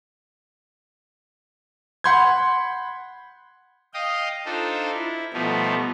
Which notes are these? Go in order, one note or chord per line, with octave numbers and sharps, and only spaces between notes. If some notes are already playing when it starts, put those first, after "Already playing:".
F#5 B5 C6 G6 G#6
D#5 F5 G5 D#6
D4 D#4 F4 A4 C5
E4
B2 F3 G3 A3 B3 D#4